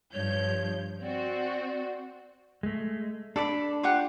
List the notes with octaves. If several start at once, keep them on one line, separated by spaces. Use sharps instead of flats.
G2 F3 C#5 G6
C4 F#4 D5
G#3 A3
D4 A4 D5 B5
F4 G4 F#5